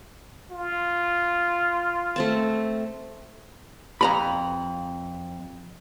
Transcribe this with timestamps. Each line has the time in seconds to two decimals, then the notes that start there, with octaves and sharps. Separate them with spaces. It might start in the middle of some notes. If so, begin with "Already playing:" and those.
0.51 F4
2.16 A3 C4 A5
4.01 F2 A#5 B5